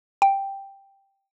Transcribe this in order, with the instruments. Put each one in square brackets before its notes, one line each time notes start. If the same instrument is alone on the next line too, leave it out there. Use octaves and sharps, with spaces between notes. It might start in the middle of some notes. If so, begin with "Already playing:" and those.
[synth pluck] G5